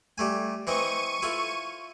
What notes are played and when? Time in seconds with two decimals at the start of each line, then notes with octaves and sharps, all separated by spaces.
0.18 G3 A3 G#5
0.67 E3 C4 D#5 C#6 D#7
1.22 E4 F4 A4